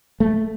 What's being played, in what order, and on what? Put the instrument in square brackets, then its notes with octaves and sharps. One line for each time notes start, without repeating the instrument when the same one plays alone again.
[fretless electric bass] A3